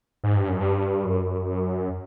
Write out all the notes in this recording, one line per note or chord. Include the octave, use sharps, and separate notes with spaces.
G#2
G2
F#2
G2
F#2